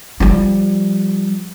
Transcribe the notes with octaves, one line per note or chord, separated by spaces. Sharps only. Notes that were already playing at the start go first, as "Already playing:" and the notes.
F3 G3